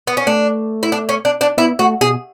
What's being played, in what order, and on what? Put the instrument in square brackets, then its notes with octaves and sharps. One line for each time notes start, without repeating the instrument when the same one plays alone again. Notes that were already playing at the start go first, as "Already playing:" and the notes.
[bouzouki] B3
C#4
[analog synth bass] A3 [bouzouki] D4
[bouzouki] E4
D4
C#4
D4
D4
[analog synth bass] B3 [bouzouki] E4
[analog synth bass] A3 [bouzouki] F#4
[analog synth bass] B2 [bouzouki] G#4